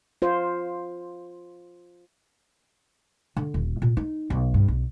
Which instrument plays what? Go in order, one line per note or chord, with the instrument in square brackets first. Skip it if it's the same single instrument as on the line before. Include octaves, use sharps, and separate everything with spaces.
[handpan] F4 C5
[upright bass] D3
D#1
A#2
D#4
B1
G2
B1